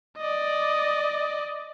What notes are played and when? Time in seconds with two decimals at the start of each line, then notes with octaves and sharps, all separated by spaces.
0.18 D5 D#5